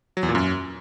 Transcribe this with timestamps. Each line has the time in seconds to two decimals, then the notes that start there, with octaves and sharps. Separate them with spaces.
0.17 F#3
0.23 E2
0.29 A#2
0.35 F#2